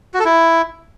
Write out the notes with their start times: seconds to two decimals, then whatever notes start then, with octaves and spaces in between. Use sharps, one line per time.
0.14 F#4
0.19 A4
0.25 E4